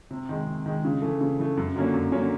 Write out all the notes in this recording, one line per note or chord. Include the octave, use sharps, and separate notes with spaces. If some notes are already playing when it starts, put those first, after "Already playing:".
C3
D#3 G#3
C3
D#3 G#3
C#3
E3 A3
C#3
E3 A3
F#2
D3 F#3 A#3 C#4
F#2
D3 F#3 A#3 C#4